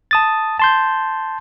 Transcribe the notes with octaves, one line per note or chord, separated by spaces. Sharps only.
A5 D#6 A6
A5 C6 G6